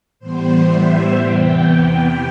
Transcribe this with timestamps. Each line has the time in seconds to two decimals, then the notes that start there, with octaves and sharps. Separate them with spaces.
0.19 A2 E3 G3 B3 C5
0.70 E5
1.21 E2 C3 E3 B3 G5
1.71 G5